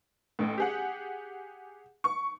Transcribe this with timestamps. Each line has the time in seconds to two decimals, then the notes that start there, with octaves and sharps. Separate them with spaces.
0.39 A1 A2
0.58 G4 G#4 F#5
2.04 C#6